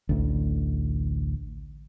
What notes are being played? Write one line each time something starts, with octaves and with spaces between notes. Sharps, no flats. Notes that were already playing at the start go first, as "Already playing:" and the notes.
A1 D2